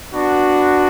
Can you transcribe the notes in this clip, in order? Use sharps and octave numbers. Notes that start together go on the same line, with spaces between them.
B3 D4 F#4